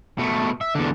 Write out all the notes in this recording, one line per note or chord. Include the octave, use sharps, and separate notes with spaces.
B2 A3
E5
E2 D3